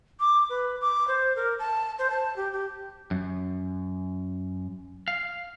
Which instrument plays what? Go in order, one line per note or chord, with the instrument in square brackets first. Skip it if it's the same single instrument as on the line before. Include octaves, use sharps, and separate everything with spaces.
[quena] D6
B4
D6
C5
A#4
A5
C5
A5
G4
G4
[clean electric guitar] F#2
F5